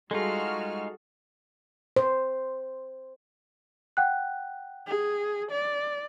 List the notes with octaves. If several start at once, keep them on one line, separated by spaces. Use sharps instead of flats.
G3 G#3 D#4 F4 F#4 G#4 A4 F6
C5
F#5 G5 F#6
G#4
D5